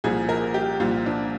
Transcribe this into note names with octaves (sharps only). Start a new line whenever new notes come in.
C2 A#2 F3 G#4
A#4
G4
C2 A#2 F3 F4
D4